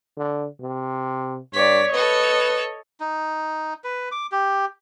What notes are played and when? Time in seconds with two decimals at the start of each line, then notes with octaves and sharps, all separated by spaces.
0.17 D3
0.61 C3
1.54 G2 C#5 D5 B6
1.93 A4 B4 C#5 D#5
3.00 D#4
3.84 B4
4.12 D6
4.32 G4